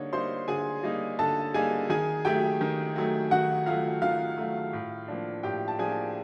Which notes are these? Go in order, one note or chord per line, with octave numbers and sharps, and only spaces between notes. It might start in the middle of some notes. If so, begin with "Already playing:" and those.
Already playing: D3 G3 A#3 D#4 C#5
G3 A#3 D#4 C5 C6
D3 G#4 G#5
G3 A#3 D#4
D3 A4 A5
G3 A#3 D#4 G#4 G#5
D#3 G#4 G#5
F#3 A3 G4 G5
D#3
F#3 A3
D#3 F#4 F#5
F#3 A3 F4 F5
D#3 F4 F5
F#3 A3
A2
F3 A#3 D4
A2 G4 G5
A5
F3 A#3 D4 G#4 G#5